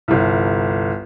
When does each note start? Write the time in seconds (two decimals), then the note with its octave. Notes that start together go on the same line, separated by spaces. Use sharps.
0.08 G1 C2